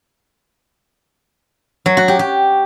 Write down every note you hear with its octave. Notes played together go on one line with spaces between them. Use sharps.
F#3
F#4
G4
G4